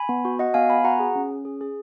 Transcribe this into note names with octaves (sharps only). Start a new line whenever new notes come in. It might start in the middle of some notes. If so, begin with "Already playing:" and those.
Already playing: G#5 B5
B3
F#4
F#4 D#5 F#5
B3 F5 G#5
B3 G#5 B5
F#4 F#5 A#5
G#4
C#4
C#4
G#4
G#4